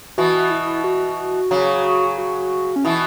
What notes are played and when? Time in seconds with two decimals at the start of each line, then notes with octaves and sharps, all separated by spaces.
0.18 B2 E3 F#4
0.51 E4
0.84 F#4
1.51 C#3 F#3
2.18 F#4
2.76 C#4
2.85 B2 E3 E4